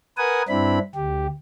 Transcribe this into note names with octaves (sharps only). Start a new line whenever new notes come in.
A#4 B4 F#5 G#5 D#6
G2 C4 D4 E4 B5
D2 G4